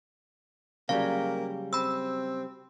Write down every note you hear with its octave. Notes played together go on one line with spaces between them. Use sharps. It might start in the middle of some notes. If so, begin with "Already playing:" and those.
C#3 F#3 G3 A#3 F5
C4 B5 E6